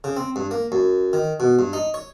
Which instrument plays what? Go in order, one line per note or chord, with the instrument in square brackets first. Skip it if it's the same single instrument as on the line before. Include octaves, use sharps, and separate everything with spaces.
[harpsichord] C#3
C4
G2
A#3
F#2
D#3
B2
G2
D#4
C#5